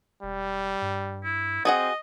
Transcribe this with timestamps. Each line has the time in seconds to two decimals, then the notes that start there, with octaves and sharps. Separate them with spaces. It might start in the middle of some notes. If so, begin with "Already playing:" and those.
0.23 E1 G3
0.82 G2
1.24 E4
1.65 C4 F#4 G#4 D#5 F#5